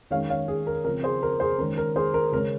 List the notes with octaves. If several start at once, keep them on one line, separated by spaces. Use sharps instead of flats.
D#3 G#3 C#4 C#5 F5
C#5 F5
G#4
A#4
C#3 F3 C4 A#4
G#4 C5
A#4
G#4 C5
D#3 G#3 C#4 A#4
A#4
G#4 C5
A#4
C#3 G#3 C#4 A#4